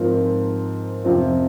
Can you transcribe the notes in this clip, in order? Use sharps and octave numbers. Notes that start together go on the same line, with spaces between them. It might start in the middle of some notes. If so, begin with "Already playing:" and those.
Already playing: G#2 F3 C4 F4 A#4
F2 C3 F3 C4 F4